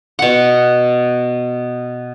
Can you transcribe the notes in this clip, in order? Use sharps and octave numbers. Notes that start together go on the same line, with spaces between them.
B2 F#5